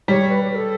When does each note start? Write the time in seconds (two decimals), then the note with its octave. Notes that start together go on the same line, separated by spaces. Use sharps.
0.08 G3 C#5
0.29 B4
0.43 G4
0.51 B4
0.55 A4